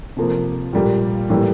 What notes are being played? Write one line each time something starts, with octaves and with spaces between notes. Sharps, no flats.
C3 F3 A#3
A#2 G3 A#3
A2 E3 G3 A#3